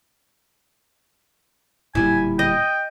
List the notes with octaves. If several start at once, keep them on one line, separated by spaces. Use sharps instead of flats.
D1 A#2 G3 E4 G#5
D#5 G5